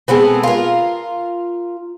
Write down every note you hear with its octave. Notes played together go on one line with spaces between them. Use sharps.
G#3 A3 B3 C4
F4 A#4